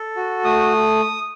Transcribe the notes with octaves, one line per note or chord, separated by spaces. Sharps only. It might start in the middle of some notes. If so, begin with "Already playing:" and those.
Already playing: A4
F#4
A3 D#6